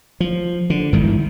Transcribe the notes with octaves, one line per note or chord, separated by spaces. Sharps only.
F3
D3
G1 G#2 D#3 E3